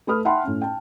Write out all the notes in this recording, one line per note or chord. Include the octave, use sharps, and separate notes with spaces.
A3 B4 B5 D#6 F6
E5 F#5 G5 A5 B5 C6
A2 C#4
G5 A5